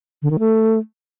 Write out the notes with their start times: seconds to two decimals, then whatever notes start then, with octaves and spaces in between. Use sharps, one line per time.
0.22 D3
0.31 D#3
0.39 A3